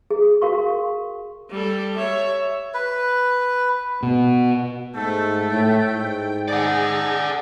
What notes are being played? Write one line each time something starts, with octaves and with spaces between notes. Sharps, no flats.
G#4
F#4 A#4 F5 C6 C#6
G3 A4
C#5 E5
B4
B2
G#2 A3 A4
A2 G5
G#2
D#4 G#4 D5 F#5